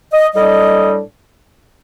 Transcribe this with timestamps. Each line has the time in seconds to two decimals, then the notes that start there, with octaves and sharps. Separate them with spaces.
0.13 D#5
0.34 A2 G3 D4 D#5